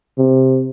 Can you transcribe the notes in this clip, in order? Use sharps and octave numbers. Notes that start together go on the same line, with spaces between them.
C3